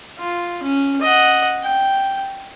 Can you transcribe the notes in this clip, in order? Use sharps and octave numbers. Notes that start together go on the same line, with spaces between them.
F4
C#4
D#5 F#5
G5